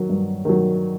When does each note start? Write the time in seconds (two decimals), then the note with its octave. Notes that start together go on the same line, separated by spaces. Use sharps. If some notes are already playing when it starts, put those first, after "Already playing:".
Already playing: D#3 F#3
0.09 G2
0.45 D#3 F#3